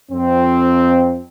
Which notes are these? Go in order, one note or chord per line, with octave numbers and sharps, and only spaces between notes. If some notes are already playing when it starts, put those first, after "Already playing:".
F2 C4